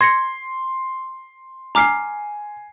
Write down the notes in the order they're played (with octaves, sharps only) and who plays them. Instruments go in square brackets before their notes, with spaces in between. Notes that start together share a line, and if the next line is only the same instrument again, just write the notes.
[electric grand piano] C6 [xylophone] G#6 A#6 C#7
[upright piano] G#5 C7 [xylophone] A#5 D6 F6